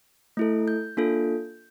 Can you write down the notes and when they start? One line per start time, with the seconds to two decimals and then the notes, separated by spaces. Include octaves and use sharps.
0.37 A3 E4 A4
0.68 G6
0.97 A#3 D4 F4 A4